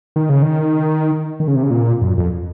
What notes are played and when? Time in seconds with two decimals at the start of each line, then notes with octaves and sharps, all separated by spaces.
0.16 D#3
0.29 C#3
0.42 D#3
1.40 D#3
1.48 C#3
1.55 C3
1.63 C#3
1.70 A#2
2.02 F#2
2.18 F2